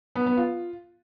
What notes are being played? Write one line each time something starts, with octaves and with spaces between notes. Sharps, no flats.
B3
B3
F4